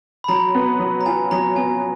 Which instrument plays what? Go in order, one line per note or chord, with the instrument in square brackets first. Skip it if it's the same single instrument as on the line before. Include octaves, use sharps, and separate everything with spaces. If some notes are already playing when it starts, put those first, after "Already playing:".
[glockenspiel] B5
[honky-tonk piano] F#3 [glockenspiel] A#5
[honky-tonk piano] B3
F#3
[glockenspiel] A#5
[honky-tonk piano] F4 [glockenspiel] G#5
[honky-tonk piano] F#3 [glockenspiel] A#5
[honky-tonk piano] B3 [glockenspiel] G#5